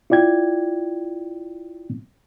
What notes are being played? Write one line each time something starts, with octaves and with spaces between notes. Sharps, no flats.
E4 F4 D5 G5 G#6